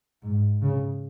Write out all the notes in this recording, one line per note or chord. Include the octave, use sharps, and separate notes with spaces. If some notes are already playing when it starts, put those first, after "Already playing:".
G#2
C#3